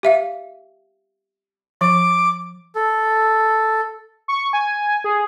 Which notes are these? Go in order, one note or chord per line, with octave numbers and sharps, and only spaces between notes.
G4 E5 F5
F3 D6
A4
C#6
G#5
G#4